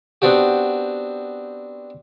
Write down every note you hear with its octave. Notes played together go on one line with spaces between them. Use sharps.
B3 C4 D4 F#4 G4